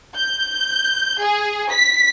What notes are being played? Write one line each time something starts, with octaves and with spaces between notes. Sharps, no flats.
G6
G#4
B6